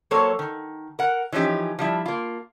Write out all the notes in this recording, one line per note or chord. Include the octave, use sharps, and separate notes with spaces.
F#3 A#3 A4 C5 C#5
D#3
A#4 F#5
E3 F3 C#4 D#4 G4
F3 G3 E4
A#3 F4